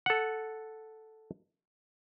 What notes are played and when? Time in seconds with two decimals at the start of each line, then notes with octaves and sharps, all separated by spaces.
0.06 A4 F#5